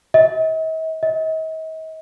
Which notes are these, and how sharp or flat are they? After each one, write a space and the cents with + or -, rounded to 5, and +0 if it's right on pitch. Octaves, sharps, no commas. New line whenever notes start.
D#5 +45
D#5 +40